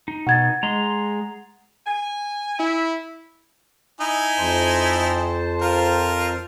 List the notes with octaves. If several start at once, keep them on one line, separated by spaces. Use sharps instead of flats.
D#4
B2 F#5 G#6 A6
G#3 A#5 C6
G#5
E4
D#4 E4 G#5
F2 C5 A5
F4 A#4